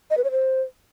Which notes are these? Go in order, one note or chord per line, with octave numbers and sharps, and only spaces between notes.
D#5
B4
C#5
C5